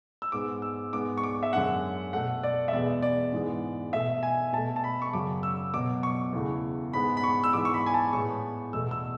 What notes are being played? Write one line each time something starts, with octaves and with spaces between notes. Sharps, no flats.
E6
G#2 G#3 B3 D6
E6
G#2 G#3 B3 D6
C#6
D6
E5
F#2 D3 G#3 F#5
B2 A3 F#5
D5
E5
E2 B2 G#3 B3 D5
D5
G#2 E3 G#3 B3
B2 A3 E5
G#5
B2 A3 A5
A5
B5
C#6
F#2 C#3 F#3 D6
E6
B2 F#3 B3 D6
C#6
E2 C#3 E3 A3
G#2 G#3 B3 B5
B5
C#6
E6
G#2 E3 G#3 B3 D6
C#6
B5
G#5
A5
A2 G#3 B3 C#6
E2 B2 A3 E6
E6